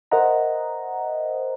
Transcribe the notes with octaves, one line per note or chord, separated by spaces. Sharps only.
A#4 C5 D#5 E5 F#5 A#5